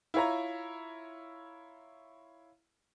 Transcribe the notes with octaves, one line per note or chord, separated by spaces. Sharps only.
E4 F4 C#5 A#5